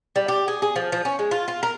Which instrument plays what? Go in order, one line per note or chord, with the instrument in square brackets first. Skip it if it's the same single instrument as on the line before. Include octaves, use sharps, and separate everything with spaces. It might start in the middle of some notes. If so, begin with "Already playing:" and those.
[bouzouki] G3
G4
G#4
G#4
F3
F3
C#4
G#3
F4
F4
A#4